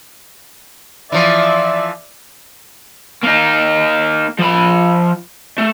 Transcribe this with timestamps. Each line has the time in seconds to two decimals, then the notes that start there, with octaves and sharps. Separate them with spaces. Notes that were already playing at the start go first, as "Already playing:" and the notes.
1.12 E3 F3 D5 E5
3.24 A#3 D#4
4.39 F3 B5
5.58 A3